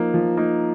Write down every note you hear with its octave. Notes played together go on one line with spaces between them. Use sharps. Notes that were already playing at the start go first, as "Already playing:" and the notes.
Already playing: F3 A#3 D#4
F3
A#3 D#4